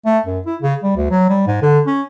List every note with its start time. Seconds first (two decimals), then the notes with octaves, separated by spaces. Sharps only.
0.05 A3
0.26 F#2
0.46 E4
0.62 C#3
0.83 G3
0.96 D2
1.11 F#3
1.30 G3
1.47 G#2
1.62 D3
1.87 C#4